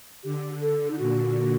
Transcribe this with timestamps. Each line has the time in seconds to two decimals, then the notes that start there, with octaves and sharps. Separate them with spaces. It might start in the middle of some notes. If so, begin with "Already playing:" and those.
0.24 D3 G4
0.61 A4
0.91 D#4
0.99 A#2 F#4